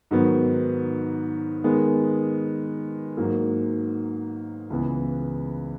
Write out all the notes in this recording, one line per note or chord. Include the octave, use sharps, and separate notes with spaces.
G#2 D#3 F#3 B3
D#3 G#3 B3
G#2 F#3 A#3
C#2 C#3 E3 B3